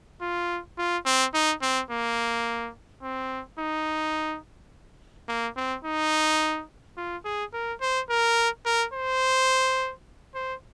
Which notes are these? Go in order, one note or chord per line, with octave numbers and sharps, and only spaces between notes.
F4
F4
C4
D#4
C4
A#3
C4
D#4
A#3
C4
D#4
F4
G#4
A#4
C5
A#4
A#4
C5
C5